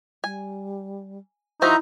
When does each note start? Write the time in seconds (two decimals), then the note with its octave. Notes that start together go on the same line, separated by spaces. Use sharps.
0.24 G3 G#5
1.62 F3 D#4 E4 F#4 C5 E5 A#5